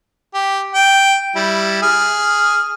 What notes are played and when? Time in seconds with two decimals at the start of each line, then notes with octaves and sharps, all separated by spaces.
0.34 G4
0.75 G5
1.36 G3 E4
1.83 G#4 F6